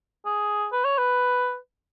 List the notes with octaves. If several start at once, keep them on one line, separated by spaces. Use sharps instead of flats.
G#4
B4
C#5
B4